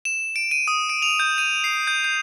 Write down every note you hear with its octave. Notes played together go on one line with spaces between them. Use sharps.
E7
D7
D#7
D#6
D7
F7
G6
D#7
C7
G6
G6